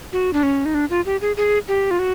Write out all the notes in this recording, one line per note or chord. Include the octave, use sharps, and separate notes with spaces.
F#4
D4
C#4
D#4
D4
F4
G4
G#4
G#4
G4
F4
F#4